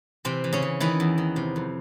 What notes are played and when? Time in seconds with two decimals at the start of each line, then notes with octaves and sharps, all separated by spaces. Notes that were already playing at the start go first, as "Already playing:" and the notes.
0.25 C3 E3 C4
0.44 E3
0.53 C#3 C#4
0.62 E3
0.80 D#3 E3 E4
1.00 E2
1.18 D#3
1.36 C3
1.56 F2